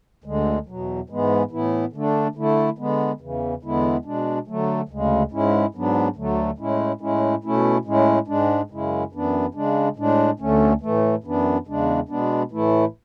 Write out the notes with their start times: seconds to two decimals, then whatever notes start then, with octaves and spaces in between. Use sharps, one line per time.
0.24 D2 D3 G#3
0.67 E2 B2 F#3
1.09 G#2 E3 G#3 B3
1.51 A2 E3 B3 E4
1.93 D3 A3 D4
2.35 D3 A3 E4
2.78 D3 G#3 B3
3.21 E2 C#3 E3
3.63 E2 D3 G#3 B3 E4
4.05 B2 G#3 D4
4.47 D3 F#3 A3
4.89 D2 C#3 G#3
5.31 G#2 G#3 C#4 E4
5.75 G#2 F#3 B3 D4
6.16 D2 D3 F#3 A3
6.58 A2 G#3 C#4 E4
7.01 A2 G#3 C#4 E4
7.44 B2 A3 C#4 E4
7.85 A2 G#3 C#4 E4
8.27 G#2 G#3 D4
8.70 F#2 C#3 G#3 C#4 E4
9.13 F#2 E3 B3 D4
9.54 C#3 G#3 D4
9.97 A2 G#3 D4
10.39 D2 D3 A3 C#4
10.81 A2 E3 A3
11.24 F#2 E3 B3 D4
11.67 E2 C#3 G#3 D4
12.09 B2 G#3 B3 D4
12.51 A2 E3 A3 E4